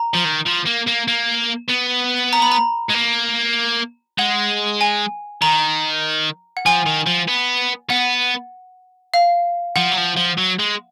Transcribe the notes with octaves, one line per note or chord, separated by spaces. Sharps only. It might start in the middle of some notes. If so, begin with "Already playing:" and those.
Already playing: A#5
F3
D#3
F3
A#3
A#3
A#3
B3
A#5
B5
A#5
G#3
A#3
G#3 F#5
G#5
D#3 A#5
F#5
F3 G#5
D#3
F3
B3
B3 F#5
F5
F3 F#5
F#3
F3
F3
F#3
G#3